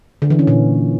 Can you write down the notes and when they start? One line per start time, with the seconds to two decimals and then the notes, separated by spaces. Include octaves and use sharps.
0.22 D3
0.30 E3
0.39 C#4
0.47 A#2